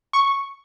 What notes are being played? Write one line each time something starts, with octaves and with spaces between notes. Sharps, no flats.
C#6